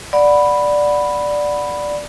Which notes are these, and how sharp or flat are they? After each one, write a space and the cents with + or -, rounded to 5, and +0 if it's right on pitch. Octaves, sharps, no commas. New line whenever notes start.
D5 +0 F#5 -15 B5 +0